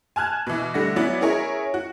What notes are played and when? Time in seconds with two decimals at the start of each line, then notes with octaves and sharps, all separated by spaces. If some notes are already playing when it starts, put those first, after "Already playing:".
0.16 G#5 A5 F6 F#6 G#6
0.47 B2 E3
0.74 D3 G3 A3 F#5 A#6
0.96 F#3 B3 C#4 E4 F#4 D5
1.21 C#4 E4 G#4 A#4 C#5
1.74 F#4